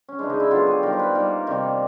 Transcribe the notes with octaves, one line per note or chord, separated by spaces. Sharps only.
C#4
C#3 E3 G#3 D4
D#4
E4
D3 F#3 B3 F4
G4 G#4
D#3 G3 B3 A#4
C5
B4
D#3 G3 A#3 A#4
C3 D#3 G3